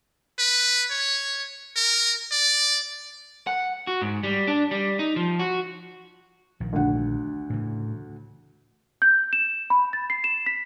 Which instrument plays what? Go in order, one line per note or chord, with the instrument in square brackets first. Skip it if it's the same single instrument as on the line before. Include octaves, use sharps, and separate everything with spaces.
[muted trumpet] B4
C#5
A#4
D5
[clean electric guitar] F#5
F#4
G#2
G3
D4
G3
D#4
F3
F#4
[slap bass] A#1 D#3
[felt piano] D2 F#5
[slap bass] A2 C#3 E3
[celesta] G6
E7
B5
A6
C7
E7
B6